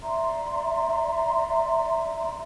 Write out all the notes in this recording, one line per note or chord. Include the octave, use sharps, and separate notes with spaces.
D5 E5 A#5 C6